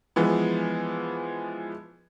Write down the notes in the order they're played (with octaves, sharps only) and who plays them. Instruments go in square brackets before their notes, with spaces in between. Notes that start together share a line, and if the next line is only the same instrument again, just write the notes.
[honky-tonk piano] E3 F3 G#3 B3